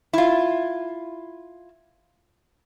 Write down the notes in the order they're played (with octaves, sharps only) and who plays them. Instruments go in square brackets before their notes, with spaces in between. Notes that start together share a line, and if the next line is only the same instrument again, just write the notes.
[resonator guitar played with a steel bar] E4 F4